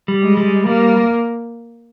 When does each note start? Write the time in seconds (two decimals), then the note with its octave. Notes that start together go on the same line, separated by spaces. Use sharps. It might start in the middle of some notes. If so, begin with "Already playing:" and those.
0.08 G3
0.23 G#3
0.37 G3
0.67 G3 A#3